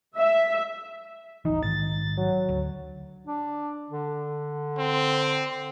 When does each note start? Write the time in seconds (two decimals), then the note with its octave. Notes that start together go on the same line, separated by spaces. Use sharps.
0.16 E5
1.45 D1 G1 E3 D#4
1.63 A#1 G#2 D#3 A6
2.17 F#3
2.49 D2
3.27 D4
3.90 D3
4.78 C4